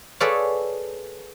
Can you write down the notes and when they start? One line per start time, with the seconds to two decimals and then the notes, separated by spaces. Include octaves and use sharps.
0.20 G#4 A4 B4 C#5 D5 F5